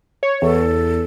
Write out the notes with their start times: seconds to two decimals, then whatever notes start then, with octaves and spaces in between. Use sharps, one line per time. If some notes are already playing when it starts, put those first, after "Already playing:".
0.23 C#5
0.42 E2 A4